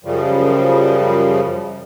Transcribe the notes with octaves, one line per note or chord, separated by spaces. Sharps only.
F#2 C#3 F3 G3